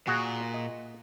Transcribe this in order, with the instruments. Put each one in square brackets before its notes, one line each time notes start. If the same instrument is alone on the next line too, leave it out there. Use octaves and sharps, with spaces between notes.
[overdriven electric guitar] A#2 [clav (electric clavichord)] F#4 G#4
[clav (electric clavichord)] D#5